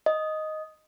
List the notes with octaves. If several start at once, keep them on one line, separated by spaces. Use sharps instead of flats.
D#5